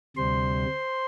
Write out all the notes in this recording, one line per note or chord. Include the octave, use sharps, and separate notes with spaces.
D2 C3 G3 C5 C6